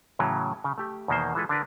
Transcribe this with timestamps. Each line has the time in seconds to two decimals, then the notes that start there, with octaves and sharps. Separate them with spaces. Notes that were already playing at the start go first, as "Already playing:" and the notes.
0.19 A2 C#3 E3 F#3
0.64 C#3
0.78 A3 G4
1.08 E2 B2 D#3 A#3 C5
1.35 E3 G#3 F4 A4 B4
1.49 D3 D4 A#4 B4